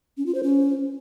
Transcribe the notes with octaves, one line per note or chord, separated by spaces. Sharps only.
C#4
F4
C5
C#4